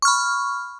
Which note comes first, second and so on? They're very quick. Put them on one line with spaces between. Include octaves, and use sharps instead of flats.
C#6 F6 B5